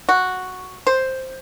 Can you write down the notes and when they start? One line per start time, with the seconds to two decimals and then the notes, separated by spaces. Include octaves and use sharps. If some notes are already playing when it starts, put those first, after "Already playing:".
0.09 F#4
0.87 C5